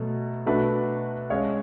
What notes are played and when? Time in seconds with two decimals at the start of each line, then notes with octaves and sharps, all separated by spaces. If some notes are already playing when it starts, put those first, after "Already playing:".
Already playing: B2 F#3 A3
0.46 B2 A3 D4 F#4 B4
1.30 G#3 C#4 G#4 C#5 F5